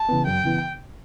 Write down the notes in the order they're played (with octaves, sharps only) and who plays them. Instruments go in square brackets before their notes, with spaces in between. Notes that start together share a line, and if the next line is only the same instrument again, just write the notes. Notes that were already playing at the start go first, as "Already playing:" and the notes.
Already playing: [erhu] A5
[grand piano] C#3 E3 B3
[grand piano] F#2 [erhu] G5
[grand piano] C#3 E3 B3